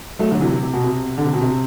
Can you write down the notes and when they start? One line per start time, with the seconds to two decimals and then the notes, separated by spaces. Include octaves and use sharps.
0.19 F#3 A3
0.31 D3 F#3
0.41 C3 E3
0.52 C3
0.63 C3
0.74 B2
0.84 C3
1.18 D3
1.25 C3
1.34 B2
1.41 C3